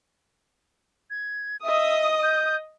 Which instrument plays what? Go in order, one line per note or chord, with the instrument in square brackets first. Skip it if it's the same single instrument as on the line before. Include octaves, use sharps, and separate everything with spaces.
[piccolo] G#6
[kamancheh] D#5 D#6 [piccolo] E5
[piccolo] G6